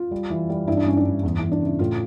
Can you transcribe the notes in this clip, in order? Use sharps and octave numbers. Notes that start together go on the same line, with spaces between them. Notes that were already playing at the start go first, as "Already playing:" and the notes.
Already playing: F4
G3
E3
G3
G2 E4
D4
G2 C#4
D4
G2
E2
E2 E4
D4
C#3
E4
A2 F4